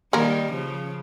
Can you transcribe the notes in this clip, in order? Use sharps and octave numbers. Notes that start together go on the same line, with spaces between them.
D#3 G3 A#3 A#4
C#3 F3